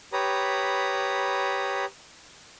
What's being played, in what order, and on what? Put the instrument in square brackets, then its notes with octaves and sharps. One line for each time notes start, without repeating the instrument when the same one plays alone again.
[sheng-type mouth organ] G4 B4 C#5 A#5 B5 D#6